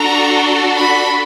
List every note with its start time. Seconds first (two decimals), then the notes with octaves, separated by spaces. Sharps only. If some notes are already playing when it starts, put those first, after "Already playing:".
Already playing: D4 F#4 A4 A#5
0.77 B5